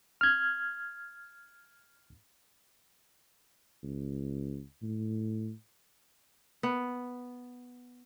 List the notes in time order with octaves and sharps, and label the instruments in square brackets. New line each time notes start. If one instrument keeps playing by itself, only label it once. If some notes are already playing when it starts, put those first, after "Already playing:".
[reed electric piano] F6 G#6
[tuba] C#2
A2
[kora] B3